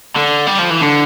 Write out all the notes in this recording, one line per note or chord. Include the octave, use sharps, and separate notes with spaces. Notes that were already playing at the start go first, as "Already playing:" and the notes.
D3
G3
F3
E3
D3